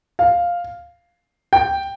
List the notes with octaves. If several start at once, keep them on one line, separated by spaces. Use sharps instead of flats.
F5
G5